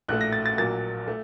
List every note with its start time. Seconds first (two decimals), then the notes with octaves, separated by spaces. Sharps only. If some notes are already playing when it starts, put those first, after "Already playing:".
0.08 A#1 A2 A3 F#6
0.21 A#6
0.33 A6
0.46 A6
0.57 A#1 A#2 F#3 A#3 A6
1.08 A3